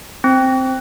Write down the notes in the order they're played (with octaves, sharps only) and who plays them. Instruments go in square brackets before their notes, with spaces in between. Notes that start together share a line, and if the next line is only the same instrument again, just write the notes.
[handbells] C4